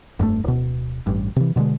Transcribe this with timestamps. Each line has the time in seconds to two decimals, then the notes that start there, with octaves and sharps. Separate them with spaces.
0.19 F1 G2 C3 A3
0.44 D1 B2
1.07 A1 G2
1.36 C3 E3
1.56 B2 D3 G3 G#3